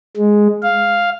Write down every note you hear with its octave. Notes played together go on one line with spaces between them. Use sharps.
G#3
F5